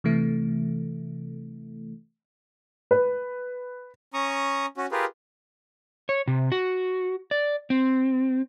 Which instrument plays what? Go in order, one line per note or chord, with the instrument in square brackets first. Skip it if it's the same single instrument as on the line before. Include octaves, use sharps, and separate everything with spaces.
[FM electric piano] C3 E3 A3
[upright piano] B4
[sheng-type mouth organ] C#4 A#5 C#6 D#6
C#4 F#4
F4 G4 G#4 A#4 B4
[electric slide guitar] C#5
C3
F#4
D5
C4